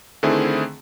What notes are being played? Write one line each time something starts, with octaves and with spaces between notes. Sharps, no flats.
D3 D#3 A3 C4 E4 G#4